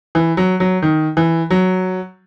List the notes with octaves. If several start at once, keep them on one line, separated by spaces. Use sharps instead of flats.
E3
F#3
F#3
D#3
E3
F#3